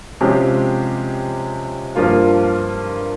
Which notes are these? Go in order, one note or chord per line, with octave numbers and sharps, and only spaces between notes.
C3 F3 G#3 C#4 G4
G2 F3 A#3 F4